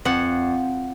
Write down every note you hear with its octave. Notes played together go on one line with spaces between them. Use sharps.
F2 F#5